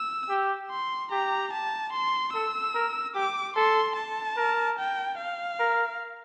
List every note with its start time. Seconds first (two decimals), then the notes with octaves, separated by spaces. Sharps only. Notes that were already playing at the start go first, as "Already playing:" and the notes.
Already playing: E6
0.29 G4
0.71 C6
1.11 G4 A#5
1.53 A5
1.93 C6
2.33 A4 E6
2.75 A#4
3.15 G4 D6
3.56 A4 C6
3.96 A5
4.37 A#4
4.79 G5
5.18 F5
5.59 A#4